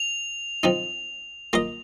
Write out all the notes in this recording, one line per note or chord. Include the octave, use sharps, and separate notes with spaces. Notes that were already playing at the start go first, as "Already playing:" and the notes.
Already playing: F7
F3 C4 D#4
A#3 F4 D#5